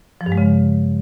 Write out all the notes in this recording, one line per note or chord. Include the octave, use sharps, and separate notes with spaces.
F3
G2
G#3
C#3